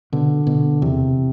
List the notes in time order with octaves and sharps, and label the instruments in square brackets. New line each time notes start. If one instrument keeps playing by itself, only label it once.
[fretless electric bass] B2 [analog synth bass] D3
[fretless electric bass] B2
[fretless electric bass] E2 [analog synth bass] C3